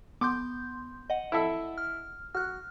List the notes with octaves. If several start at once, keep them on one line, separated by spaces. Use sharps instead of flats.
B3 C6 D6 G6
D#5 F#5
E4 A4 E5
F6
F#4 F6 F#6